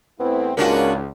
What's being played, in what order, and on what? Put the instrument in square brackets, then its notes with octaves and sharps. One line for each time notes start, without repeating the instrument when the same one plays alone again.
[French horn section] E2 C4 [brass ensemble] A3 E4 [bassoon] B3
[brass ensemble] C#2 [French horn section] G#2 C#3 F4 [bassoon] A#3 [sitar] C#4 D4 F#4